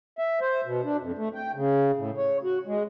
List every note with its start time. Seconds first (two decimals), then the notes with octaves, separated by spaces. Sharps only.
0.19 E5
0.41 C5
0.66 B2
0.84 D4
1.01 F2
1.18 A3
1.35 G5
1.55 C#3
1.97 A2
2.17 C#5
2.44 F#4
2.67 G#3